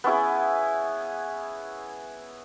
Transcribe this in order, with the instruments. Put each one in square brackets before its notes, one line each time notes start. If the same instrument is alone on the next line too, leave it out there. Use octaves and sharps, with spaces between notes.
[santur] B3 C#4 E4 G#4